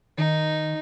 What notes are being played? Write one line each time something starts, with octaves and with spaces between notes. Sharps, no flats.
D#3 D#4